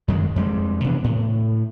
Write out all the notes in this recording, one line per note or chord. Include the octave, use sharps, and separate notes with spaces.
F#2 D#3 G#3
F2 G3 G#3
C3 E3 B3 D4
A2